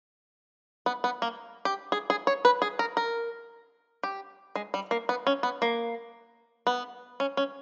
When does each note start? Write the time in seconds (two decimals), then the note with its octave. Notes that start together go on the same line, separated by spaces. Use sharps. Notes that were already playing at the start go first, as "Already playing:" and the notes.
0.86 B3
1.04 B3
1.22 A#3
1.65 G4
1.92 G#4
2.10 G#4
2.27 C#5
2.45 B4
2.62 G#4
2.79 A#4
2.97 A#4
4.03 G4
4.56 G#3
4.74 G3
4.91 A#3
5.09 B3
5.27 C#4
5.43 B3
5.62 A#3
6.67 B3
7.20 C#4
7.37 C#4